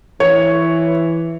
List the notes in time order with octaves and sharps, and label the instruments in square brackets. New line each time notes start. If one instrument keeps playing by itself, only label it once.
[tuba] E3 [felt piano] C#5